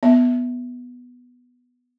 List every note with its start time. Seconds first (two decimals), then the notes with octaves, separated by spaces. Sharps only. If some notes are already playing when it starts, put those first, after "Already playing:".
0.03 B3 E5